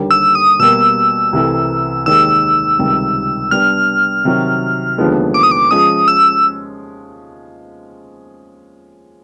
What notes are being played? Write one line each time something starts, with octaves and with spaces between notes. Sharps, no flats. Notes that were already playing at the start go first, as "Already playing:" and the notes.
Already playing: D#2 D3 G3 A#3
E6
D#6
B2 G3 A#3 E6
C2 C3 E3 A3
D#2 D#3 G#3 E6
C#2 C3 D#3 G3
G3 B3 D4 F6
C3 D#3 F#3
D#2 D3 F3 G#3 B3
D6
D#6
D6
F3 G#3 C#4 D#6
E6